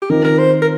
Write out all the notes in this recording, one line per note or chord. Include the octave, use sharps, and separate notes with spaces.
G4
D#3 C4 F4 A#4
A#4
C5
A#4